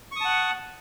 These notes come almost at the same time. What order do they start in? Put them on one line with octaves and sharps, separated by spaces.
C#6 D#6 A5 F#5